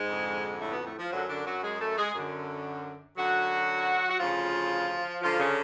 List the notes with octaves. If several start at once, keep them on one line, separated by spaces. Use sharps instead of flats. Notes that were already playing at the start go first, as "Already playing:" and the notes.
Already playing: G#2 G#3
F2 D3
A2 A3
B2 B3
A2 A3
F3
F#2 D3 F#3
D3 D4
F#3 F#4
G#3 G#4
A3 A4
G#3 G#4
F#2 D3
F#2 D3 F#3 F#4
F#4
D2 C#3 F3 F4
F#2 D3 F3 F4
C#3 C#4